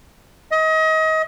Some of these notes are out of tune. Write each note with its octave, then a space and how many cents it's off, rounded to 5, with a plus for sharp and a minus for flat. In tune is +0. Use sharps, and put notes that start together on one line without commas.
D#5 +30